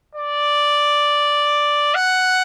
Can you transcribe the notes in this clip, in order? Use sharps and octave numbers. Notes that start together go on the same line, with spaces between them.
D5
F#5